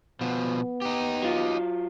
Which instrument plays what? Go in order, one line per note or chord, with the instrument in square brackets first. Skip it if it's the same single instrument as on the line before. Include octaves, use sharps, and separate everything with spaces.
[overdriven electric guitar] B2 F3 [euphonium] B3
[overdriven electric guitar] D#4 G4
[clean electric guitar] F#3 F4